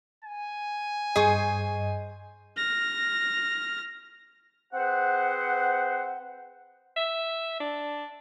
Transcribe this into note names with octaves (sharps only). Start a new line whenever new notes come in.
G#5
G2 G#4 C5 D#5 C#6
F6 A#6
C4 G#4 B4 C5 F#5
E5
D4